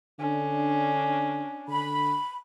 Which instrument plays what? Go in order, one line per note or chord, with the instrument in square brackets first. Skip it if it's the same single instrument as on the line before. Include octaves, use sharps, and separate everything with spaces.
[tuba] D3 [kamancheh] C#4 D4
[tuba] D3 [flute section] B5